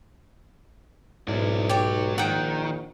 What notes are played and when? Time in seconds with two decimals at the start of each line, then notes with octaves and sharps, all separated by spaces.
1.28 B1 G#2 E4 D5
1.69 F#3 G4 C#5 D5
2.18 A#1 D#3 F#5 G5